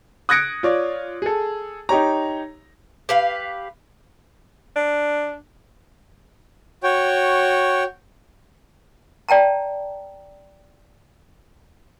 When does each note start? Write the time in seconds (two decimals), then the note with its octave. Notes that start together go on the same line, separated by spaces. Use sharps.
0.29 D#6 F#6 G#6 A#6 C#7 D7
0.63 F4 C#5 D5
1.22 G#4 A4
1.89 D#4 G4 C#5 A#5
3.09 G4 B4 F5
4.76 D4
6.83 F#4 C#5 G5
9.29 D5 G5 A5 A#5